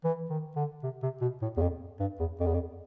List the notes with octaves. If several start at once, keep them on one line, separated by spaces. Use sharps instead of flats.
E3
D#3
D3
C3
C3
B2
A2
E2
F2
G2
E2
F2
E2
F2